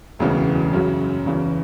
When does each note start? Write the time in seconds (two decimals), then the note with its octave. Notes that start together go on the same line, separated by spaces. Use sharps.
0.19 E1 D2 C#3 E3 B3
0.73 F#2 C#3 F#3
1.26 E2 C#3 E3